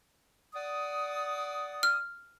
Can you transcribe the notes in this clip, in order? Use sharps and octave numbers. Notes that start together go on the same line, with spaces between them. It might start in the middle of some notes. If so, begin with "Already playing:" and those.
D5 F#5 D#6
F6